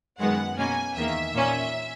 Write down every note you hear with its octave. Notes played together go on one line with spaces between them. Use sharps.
F#2 D#3 G#3 B3 F#5
B2 A#3 C#4 G#5
E2 D#3 A#3 E5
A#2 A#3 C#4